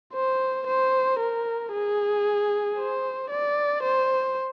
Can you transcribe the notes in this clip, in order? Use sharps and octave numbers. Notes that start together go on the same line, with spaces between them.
C5
C5
A#4
G#4
C5
D5
C5